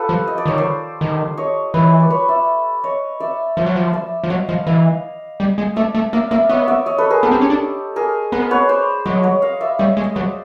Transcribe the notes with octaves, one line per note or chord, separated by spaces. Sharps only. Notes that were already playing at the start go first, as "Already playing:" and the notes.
Already playing: F4 G4 A4 B4
F3
D#5
D5
D#3 C#5
C5 D5
D#3
C#5 D#5
E3 B4 C#5
D5
B4 C#5
D5 E5
C#5 D#5
D5 E5
F3 D5 E5
F#3
F3
D5 E5
F3
F#3 D#5 F5
F3 D#5 F5
E3 D#5 F5
G3
G#3
A3 D5 E5
A3
A#3 D5 E5
A#3 D5 E5
B3 C#5 D#5
D5 E5
C#5 D#5
A4 B4
G#4 A#4
B3 G4 A4
C4
C#4
D4
G#4 A#4
B3 A#4 C5
B4 C#5
C5 D5
F#3 C#5 D#5
C#5 D#5
D#5 F5
D5 E5
G3 C#5 D#5
G#3
D#5
F#3 C5 D5